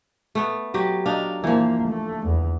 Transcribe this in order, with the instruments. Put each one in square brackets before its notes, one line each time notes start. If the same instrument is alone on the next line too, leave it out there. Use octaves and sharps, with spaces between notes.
[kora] A3 B3
F#3 G4
[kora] D4 D#4 [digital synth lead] F5
[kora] A#2 F3 [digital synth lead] E3 [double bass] A#3
[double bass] A3
E2